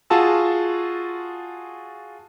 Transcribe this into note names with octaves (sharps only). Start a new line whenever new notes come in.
F4 F#4 G#4 A5 E6